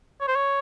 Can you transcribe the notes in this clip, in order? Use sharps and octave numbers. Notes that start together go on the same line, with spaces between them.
C#5
C5
C#5